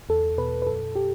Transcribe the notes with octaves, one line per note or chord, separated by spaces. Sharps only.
E2 A4
B2 B4
B4
F#2 A4
G4